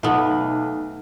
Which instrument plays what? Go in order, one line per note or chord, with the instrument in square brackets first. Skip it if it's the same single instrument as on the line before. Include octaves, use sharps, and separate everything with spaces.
[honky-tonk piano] B1 [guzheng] A3 B3